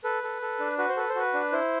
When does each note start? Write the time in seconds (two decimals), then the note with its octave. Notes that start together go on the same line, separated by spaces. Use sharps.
0.04 A4 B4
0.23 A4
0.42 A4
0.59 D4
0.78 F#4 B4
0.89 C5
0.97 A4 B4
1.09 C5
1.15 F#4 B4
1.34 D4
1.52 E4 C5